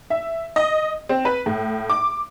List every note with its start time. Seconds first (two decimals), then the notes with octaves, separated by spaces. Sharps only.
0.10 E5
0.56 D#5
1.09 C4
1.25 B4
1.46 A2
1.90 D6